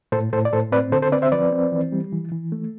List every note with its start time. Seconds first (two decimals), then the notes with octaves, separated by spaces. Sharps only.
0.12 A2 A4 C5
0.33 A2 A4 C5
0.45 D5
0.53 A2 A4 C5
0.72 C4 B4 D5
0.92 D3 A4 C5
1.02 A4 C5
1.12 C4 B4 D5
1.22 C5 E5
1.32 F3 B4 D5
1.52 C4
1.72 E3
1.92 G3
2.12 E3
2.32 E3
2.52 A3